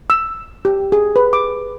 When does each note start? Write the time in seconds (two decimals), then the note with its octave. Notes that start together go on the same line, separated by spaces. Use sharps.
0.10 E6
0.65 G4
0.92 G#4
1.16 B4
1.33 D6